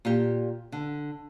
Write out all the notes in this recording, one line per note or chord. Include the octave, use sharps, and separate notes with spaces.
A#2 F4 G4
D3